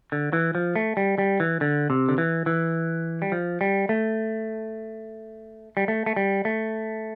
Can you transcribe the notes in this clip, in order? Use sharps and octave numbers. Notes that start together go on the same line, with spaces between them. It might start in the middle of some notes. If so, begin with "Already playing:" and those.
D3
E3
F3
A3
G3
G3
E3
D3
C3
D3
E3
E3
G3
F3
G3
A3
G3
A3
A3
G3
A3